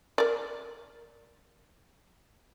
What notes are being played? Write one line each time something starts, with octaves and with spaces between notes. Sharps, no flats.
A#4 D5